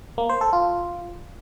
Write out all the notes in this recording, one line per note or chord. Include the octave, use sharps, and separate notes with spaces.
A#3
C5
A4
F4